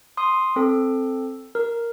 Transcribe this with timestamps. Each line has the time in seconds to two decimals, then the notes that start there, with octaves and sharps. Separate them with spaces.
0.17 C6 D#6
0.56 C4 A4
1.55 A#4